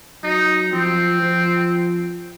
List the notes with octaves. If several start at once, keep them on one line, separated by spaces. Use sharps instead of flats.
F#3 D#4
F3 C4
F3